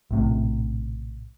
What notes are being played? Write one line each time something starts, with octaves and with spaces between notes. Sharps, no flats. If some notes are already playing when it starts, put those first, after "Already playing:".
A#1 A2 C3